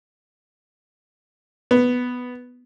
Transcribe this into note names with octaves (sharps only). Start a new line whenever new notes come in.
B3